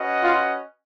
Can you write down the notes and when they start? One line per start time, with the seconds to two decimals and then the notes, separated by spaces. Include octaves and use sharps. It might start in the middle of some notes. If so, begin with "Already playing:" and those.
Already playing: C#4 F#4 B4 D#5 F#5
0.23 F4